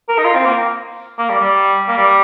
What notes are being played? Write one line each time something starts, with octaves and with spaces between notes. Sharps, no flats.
A#4
D#4
F4
C4
A#3
A#3
G3
G3
A#3
G3